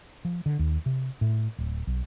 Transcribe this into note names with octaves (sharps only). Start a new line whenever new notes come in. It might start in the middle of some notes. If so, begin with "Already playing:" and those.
F3
D3
D#2
C3
A2
D1
B1